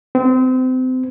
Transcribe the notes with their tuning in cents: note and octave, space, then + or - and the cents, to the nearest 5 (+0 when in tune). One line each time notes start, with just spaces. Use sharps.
C4 -30